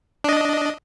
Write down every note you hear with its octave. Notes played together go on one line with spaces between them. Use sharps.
D4 D#5